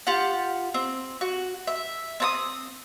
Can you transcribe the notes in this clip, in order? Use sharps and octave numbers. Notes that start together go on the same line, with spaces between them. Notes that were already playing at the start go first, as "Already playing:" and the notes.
F4 G4 F#5
C4
F#4
E5
C4 A5 D#6